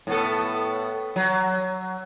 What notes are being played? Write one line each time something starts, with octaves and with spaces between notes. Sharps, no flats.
A2 B3 A4
F#3